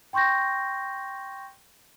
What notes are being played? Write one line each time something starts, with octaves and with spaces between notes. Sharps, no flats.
G5 C6 C#6 G6 A#6